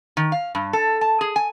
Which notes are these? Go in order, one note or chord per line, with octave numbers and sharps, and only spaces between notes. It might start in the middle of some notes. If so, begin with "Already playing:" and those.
D#3
F5
G2
A4
A5
G#4
G#5